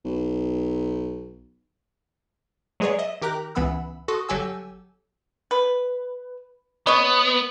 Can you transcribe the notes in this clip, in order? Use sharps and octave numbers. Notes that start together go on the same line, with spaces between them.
B1
F#3 G#3 G#4 B4 C#5 D5
D#5 E5
D#3 G4 A#4 A#5 F#6
C#2 E3 B3 F#5 B5 E6
F#4 A4 C6 C#6 D#6 A#6
G1 F#3 G4 A4 G#5 E6
B4
B3 C#5 D#5